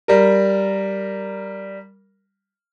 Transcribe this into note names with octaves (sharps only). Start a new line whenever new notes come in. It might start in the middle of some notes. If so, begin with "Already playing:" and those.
G3 A#4